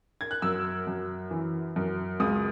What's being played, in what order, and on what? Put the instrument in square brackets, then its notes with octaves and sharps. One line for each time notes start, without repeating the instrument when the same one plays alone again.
[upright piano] G#6
F#6
F#2 E6
F#2
E3
F#2
C#2 D#6